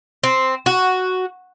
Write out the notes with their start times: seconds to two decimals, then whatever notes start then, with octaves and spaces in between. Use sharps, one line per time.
0.23 C4
0.66 F#4